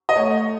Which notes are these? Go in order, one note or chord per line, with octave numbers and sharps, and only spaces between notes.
D#5
A3 C#5